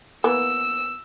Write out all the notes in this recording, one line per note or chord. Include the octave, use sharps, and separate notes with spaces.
E3 A#3 B3 E6